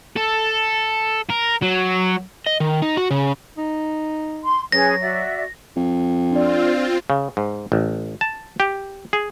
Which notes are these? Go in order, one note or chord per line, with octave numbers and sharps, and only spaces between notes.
A4
A#4
F#3
D#5
D#3
D#4
F#4
C#3
D#4
C6
F#3 C#4 G#4 B4 A#6
F#4 D5 E5
F2
C4 D4 F4 D5
C#3
G#2
A1
A5
G4
G#4